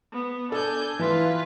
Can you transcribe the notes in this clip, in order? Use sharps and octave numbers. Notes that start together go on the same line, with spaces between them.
B3
D4 A4 G#5 G6
E3 F4 B4 F5